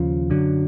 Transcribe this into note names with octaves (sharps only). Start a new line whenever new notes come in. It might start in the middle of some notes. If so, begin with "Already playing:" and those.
Already playing: D#2 C#3 F3
F#2 D3 F#3